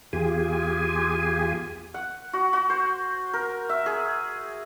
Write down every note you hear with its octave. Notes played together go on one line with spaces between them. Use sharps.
E2 F4 G4 G#4 G#5
F#5
F#4
F#4
C5
A#4
E5
G#4